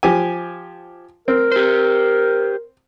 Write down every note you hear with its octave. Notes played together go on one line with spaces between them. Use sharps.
F3 G4 G#5
C4 A#4
G4 C5